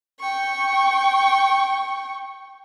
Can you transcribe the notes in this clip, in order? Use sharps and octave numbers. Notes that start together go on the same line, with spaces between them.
G5 C#6